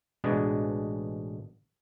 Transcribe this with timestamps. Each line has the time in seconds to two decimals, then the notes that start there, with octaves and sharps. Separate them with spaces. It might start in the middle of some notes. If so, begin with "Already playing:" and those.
0.24 A1 B2 G#3 D4